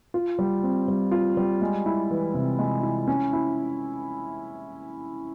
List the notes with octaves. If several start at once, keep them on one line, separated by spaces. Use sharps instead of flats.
F4
G3
C4
G3
F4
G3
G#3
E4
E3
C3
G#3
E4
C#4
E4